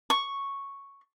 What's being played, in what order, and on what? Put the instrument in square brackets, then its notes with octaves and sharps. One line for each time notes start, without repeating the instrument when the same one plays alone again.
[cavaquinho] C#6